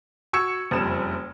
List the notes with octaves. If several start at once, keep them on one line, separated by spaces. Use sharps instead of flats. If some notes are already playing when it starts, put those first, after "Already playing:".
F#4 C#6 E6 G#6 C#7
F#1 F2 G3 E7